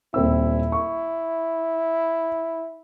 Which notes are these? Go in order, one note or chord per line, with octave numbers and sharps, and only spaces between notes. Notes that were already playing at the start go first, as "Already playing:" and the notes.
D#1 C4 E4 E6
C#6